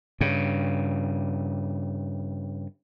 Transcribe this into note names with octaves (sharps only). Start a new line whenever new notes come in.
G2 C#3